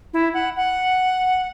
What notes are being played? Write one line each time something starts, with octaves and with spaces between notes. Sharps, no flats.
E4
F#5
F#5